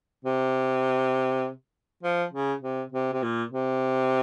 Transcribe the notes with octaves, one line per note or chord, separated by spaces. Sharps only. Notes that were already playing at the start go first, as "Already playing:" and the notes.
C3
F3
C#3
C3
C3
C3
A#2
C3